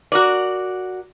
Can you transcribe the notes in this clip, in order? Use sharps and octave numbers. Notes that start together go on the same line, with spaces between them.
F#4 A#4 D5